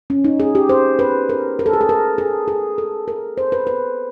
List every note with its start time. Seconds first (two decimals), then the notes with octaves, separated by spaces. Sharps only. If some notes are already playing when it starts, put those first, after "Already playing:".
0.10 C#4
0.25 D#4
0.40 G#4
0.55 G4
0.69 C5
0.99 B4
1.29 A#4
1.59 A#4
1.66 A4
1.73 G#4
1.81 A4
1.89 A#4
2.18 G#4
2.48 G#4
2.78 A4
3.08 A#4
3.38 C5
3.52 B4
3.67 B4